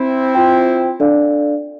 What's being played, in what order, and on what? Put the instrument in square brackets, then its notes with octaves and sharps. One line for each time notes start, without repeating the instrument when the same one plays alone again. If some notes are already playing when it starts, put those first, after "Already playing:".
Already playing: [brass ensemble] C4 E4
[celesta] F4 C5 G5
D4 A4 D5 F5